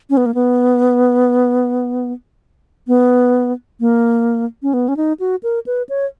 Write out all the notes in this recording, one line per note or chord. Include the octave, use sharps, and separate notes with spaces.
C#4
B3
A#3
B3
B3
A#3
C#4
B3
C#4
D#4
F#4
A#4
B4
C#5